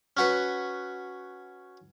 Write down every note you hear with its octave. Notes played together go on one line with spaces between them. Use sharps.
C#4 F#4 B4